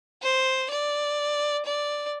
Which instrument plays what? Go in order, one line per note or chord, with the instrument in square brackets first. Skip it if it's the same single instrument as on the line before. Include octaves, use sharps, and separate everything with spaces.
[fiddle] C5
D5
D5